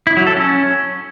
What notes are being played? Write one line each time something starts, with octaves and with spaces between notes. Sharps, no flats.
E4
F#3
A4
C#4